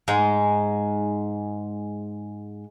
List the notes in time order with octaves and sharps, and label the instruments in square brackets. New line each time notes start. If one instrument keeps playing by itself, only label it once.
[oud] G#2 [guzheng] G#3